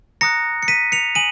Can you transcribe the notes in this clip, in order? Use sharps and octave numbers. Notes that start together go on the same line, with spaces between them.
A#5 D#6 F#6 A#6 C#7
C#7
B6 D#7
C#7 F7
G#5 D#6 D#7 F#7